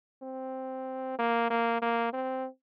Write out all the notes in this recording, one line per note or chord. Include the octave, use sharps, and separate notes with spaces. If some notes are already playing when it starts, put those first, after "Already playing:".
C4
A#3
A#3
A#3
C4